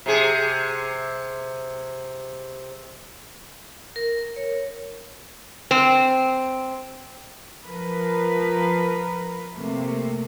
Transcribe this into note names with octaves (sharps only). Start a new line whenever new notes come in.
C3 G#4
A#4
C#5
C4
F3 A#4 B4
C3 A3 A#3